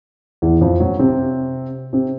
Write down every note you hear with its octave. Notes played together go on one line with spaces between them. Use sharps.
E2 E3
F2 F3
F#2 F#3
C3 C4
C3 C4